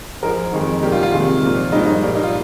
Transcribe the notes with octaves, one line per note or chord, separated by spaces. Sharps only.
G#2 F3 G#3 A#4
F2 D#3 G#3
A#2 G3 A#3 G4
F4
F4
C3 D#3 G#3
A#2 F3 A#3
G2 F3 G#3 D#4
D#4
A#2 G3 A#3
D#4
F4